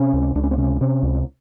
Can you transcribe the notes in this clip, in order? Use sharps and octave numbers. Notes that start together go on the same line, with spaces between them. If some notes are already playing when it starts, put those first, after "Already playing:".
Already playing: C3 C#4
C#2
C#2 D4
C#4
C4
C3 C#4
C3 C#4
C#2